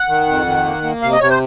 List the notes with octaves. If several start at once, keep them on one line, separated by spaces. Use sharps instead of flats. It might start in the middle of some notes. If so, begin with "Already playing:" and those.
Already playing: F#5
D#3
F2
D#3
A#3
A#3
C3 F5
D#5
C3 C#5
C5